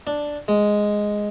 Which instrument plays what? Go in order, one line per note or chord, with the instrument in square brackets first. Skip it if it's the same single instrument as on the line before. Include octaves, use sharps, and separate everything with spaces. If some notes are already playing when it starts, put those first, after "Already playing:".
[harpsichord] D4
G#3